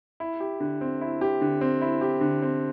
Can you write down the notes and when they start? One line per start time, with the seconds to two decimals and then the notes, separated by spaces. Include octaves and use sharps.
0.20 E4
0.40 G4
0.60 D3
0.81 C4
1.01 E4
1.21 G4
1.41 D3
1.61 C4
1.81 E4
2.01 G4
2.21 D3
2.42 C4